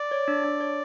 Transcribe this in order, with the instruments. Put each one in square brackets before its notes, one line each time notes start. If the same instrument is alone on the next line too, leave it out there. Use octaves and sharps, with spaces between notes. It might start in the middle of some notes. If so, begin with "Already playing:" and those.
Already playing: [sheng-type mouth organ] D5
[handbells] C#5
D4
D4
C#5